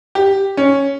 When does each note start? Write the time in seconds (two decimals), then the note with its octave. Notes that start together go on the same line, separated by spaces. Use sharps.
0.15 G4
0.57 C#4